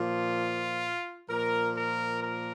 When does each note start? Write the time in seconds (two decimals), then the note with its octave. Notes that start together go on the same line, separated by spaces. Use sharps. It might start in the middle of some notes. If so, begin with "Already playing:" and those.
Already playing: A#2 F3 F4
1.29 A#2 F3 A#4
1.76 A#4
2.22 A#4